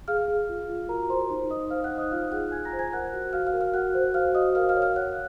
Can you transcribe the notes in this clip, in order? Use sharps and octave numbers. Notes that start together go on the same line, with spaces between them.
G#4 F5 F6
G#4
F4
F4
F#4 A#4 A#5
C5 C6
D#4
D#4 D#5 D#6
C5 F5 F6
F#5 F#6
D#4
D#5 D#6
F4 F5 F6
G#4 F#5 F#6
F4 G#5 G#6
A#5 A#6
C5
G#5 G#6
A#4 F#5 F#6
F#4
F#4 F5 F6
F5 F6
A#4
F5 F6
F#4 F#5 F#6
C5
F#4 F5 F6
F#4 D#5 D#6
A#4 F5 F6
F5 F6
C#5
F5 F6
C#5 F#5 F#6